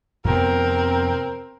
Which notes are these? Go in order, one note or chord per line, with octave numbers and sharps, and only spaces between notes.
F2 C3 B3 C4 A#4